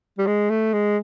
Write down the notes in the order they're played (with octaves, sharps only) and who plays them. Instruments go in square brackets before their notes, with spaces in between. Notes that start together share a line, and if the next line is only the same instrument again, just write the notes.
[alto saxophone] G3
G#3
A3
G#3